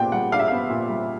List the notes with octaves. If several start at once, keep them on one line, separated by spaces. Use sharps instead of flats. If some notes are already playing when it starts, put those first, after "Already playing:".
Already playing: A#2 G3 B3 D4 G5
G3 F#5
D4 F5
E5
B3 F5
A#2
G3